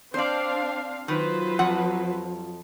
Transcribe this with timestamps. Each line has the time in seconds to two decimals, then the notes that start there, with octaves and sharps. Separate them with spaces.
0.14 C4 D4 C5 D5 F5
1.08 D#3 F#3 F4 B4 C5
1.59 F2 F#5